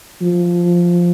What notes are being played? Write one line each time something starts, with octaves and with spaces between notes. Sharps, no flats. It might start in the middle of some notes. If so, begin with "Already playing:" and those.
F3